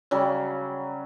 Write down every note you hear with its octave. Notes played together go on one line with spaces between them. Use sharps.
C#3 F#3 G3